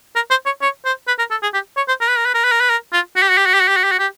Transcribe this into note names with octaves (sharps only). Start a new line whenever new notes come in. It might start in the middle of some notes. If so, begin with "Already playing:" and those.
A#4
C5
C#5
C#5
C5
B4
A#4
A4
G#4
G4
C#5
C5
A#4
B4
A#4
B4
A#4
B4
A#4
B4
A#4
F4
F#4
G4
F#4
G4
F#4
G4
F#4
G4
F#4
G4
F#4
G4